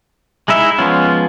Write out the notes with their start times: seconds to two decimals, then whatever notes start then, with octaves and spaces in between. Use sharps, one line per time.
0.48 G#3 D#4 E4 E5
0.78 F3 G#3 B3 C#4 F4